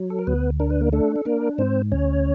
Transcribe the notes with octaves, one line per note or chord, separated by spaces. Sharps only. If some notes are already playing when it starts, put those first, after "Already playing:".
Already playing: F#3
A4
A#4
D2 B3 B4
D4 A#4
B4
A#3 A#4
A3 D4 A4
A4
A#3 D4 A#4
G#2 C4 C5
D2 C#4 C#5